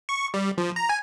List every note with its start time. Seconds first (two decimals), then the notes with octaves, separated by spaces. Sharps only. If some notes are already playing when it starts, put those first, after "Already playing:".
0.09 C#6
0.34 G3
0.58 F3
0.76 A#5
0.89 G#5